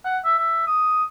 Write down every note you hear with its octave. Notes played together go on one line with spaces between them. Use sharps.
F#5
E5
E5
D#6